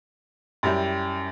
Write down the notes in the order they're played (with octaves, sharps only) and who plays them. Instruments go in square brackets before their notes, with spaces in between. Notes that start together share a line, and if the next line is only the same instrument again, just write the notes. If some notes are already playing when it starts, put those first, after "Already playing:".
[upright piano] F#2 G3 E4 G4